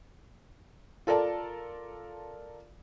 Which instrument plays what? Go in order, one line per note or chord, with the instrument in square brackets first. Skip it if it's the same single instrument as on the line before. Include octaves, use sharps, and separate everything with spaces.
[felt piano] F4 A4 A#4 D5 A5